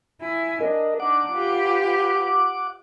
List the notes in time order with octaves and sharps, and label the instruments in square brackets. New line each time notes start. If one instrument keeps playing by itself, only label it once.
[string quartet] E4 G#5
[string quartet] D4 [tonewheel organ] A#4 D#5
[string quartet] D4 D#4 [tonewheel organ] F#5 D6
[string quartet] F4 G4 B4